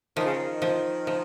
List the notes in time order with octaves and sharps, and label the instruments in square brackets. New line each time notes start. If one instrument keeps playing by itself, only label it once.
[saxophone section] D#3 [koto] F3
[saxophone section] C#3
D#3
[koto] F3
F3